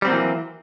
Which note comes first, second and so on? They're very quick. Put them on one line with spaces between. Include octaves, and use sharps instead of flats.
G3 C4 F#3 A#3 E3